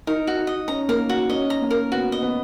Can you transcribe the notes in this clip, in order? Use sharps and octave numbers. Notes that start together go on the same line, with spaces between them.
D#4 A#4
F#4
D#4
D#5
C#4 A#5
A#3 A#4
F#4
C#4 D#5
A#5
A#3
A#4
B3 F#4
D#5
B3